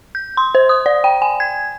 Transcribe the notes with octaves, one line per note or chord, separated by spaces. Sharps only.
G6
C6
C5
D#6
D5
G5
G#5
G#6